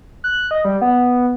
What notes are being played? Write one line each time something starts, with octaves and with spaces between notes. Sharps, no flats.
F#6
D#5
G3
B3